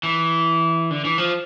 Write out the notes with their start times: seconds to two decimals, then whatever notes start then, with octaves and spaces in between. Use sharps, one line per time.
0.03 E3
0.91 D3
1.05 E3
1.18 F3